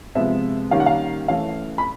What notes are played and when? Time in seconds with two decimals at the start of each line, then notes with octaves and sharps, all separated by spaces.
0.15 C3 F3 G#3 B3 E5
0.71 D#3 G3 A#3 C#4 F5
0.80 F#5
0.86 F5
1.28 E3 A3 C#4 F5
1.78 B5